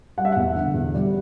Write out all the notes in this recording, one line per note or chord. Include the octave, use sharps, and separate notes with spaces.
G3 F#5
E5
E2 F#5
D3
E2
G3